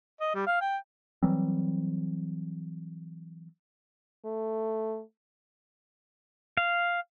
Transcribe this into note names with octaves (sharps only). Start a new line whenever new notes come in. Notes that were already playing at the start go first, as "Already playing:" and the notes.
D#5
G3
F5
G5
E3 F#3 G3 C4
A3
F5